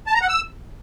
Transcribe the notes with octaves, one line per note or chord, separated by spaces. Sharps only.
A5
A#5
F#5
E6